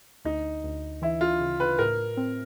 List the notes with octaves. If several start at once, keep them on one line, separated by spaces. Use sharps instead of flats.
D2 D#4
D2
E3 E4
F4
C#3
B4
A2 A#4
C4